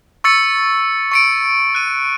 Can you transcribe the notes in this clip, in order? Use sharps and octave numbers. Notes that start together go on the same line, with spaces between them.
C#6 E6 A6 C#7
C#6 C#7 D7
F#6 D#7